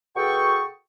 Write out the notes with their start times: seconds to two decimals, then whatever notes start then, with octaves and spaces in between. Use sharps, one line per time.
0.16 B2 F#4 G#4 A4 G5 C#6